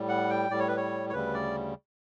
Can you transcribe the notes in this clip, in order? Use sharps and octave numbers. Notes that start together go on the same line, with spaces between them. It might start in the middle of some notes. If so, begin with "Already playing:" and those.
Already playing: A2 G3
F#5
G5
A2 G3 D5
C#5
B4
C#5
C#5
D2 C#3 G3 B4
D5